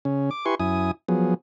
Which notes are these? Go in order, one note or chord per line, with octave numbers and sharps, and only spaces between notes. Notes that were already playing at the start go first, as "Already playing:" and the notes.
C#3 C#4
D6
E4 G4 B4 G#5 C6 C#6
F#2 E4 G#5 D#6
F3 F#3 B3 G#4